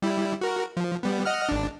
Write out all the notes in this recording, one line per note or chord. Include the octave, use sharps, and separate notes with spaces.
G3 E4
F#4 A#4
F3
G3 B3
D#5 F#5 F6
G#1 D4